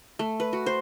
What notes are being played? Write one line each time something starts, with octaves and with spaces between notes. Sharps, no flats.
A3
B4
F#4
C5